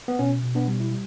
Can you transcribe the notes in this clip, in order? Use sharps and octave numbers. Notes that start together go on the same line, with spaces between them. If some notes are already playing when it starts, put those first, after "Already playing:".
B3
B2 C#4
B2
B3 D4
G3
E4
G3